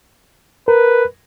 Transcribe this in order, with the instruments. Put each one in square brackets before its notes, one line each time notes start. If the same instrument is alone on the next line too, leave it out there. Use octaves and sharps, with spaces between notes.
[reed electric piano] A#4 [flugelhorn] B4